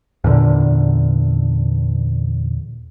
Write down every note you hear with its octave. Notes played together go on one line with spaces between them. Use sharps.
E2 A#2 D3